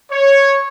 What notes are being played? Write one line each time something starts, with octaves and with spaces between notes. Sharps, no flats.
C#5